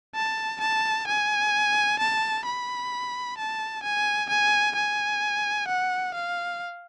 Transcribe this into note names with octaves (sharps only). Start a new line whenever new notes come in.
A5
A5
G#5
A5
B5
A5
G#5
G#5
G#5
F#5
F5